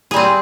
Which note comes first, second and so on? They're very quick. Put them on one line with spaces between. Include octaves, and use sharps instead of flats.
G#4 G3 C4